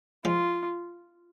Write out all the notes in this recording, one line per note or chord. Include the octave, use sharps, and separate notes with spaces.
F3 G#3 F4